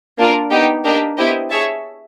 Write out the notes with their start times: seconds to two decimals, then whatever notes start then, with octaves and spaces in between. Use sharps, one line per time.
0.18 A#3 D4 F4 A#4
0.51 B3 D#4 G4
0.84 A#3 D4 G4 A#4 D#5
1.17 B3 E4 G4 C5 D#5
1.50 G#4 C#5 E5 A5